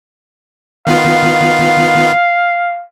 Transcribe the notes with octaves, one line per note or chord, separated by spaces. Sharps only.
D#3 B3 F4 F5